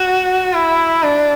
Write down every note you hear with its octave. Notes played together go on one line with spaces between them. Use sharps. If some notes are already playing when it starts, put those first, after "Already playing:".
Already playing: F#4
E4
D4